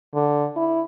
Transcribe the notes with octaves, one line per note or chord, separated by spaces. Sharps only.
D3
E4